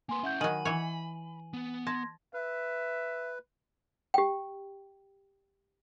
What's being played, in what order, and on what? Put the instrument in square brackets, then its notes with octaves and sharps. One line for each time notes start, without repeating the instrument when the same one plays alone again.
[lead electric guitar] A#3 B4 [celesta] G#5 C6
[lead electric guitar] C#4 E4 [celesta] E5 F#5 G6
[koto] D#3 F#3 [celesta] G#5 D#7 F#7 [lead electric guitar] B5
[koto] E3 C#5
[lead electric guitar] B3
[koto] A5 [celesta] C6 G#6 A#6
[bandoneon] B4 [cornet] E5
[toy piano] G4 G5